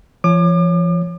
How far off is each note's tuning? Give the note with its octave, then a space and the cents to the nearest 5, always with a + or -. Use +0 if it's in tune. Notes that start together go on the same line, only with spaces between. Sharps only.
F3 -35 C#5 +0 D6 +40